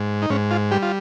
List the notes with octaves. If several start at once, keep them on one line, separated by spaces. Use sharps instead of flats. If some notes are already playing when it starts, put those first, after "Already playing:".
Already playing: G#2
D#4
G#2 C#4
F4
G3 G4
F4